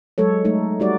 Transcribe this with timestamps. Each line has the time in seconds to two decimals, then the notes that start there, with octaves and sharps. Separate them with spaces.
0.18 F#3 G#3 A4 C#5
0.45 G#3 A3 D#4
0.80 G3 D#4 F#4 D5